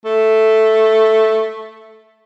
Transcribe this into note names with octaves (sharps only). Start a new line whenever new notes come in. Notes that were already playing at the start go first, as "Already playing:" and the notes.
A3